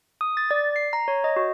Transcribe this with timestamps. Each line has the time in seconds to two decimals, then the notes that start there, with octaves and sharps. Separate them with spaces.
0.21 D#6
0.37 A6
0.51 D5
0.76 C7
0.93 A#5
1.08 C#5
1.24 D#5
1.36 F#4